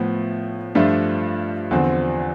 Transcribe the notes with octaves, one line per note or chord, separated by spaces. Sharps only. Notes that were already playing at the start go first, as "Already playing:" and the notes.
Already playing: A2 F3 B3
G2 F3 A3 D4 F4
E2 D3 F3 C4